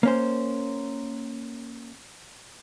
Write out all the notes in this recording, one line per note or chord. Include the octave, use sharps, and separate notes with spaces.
A#3 C#4 C5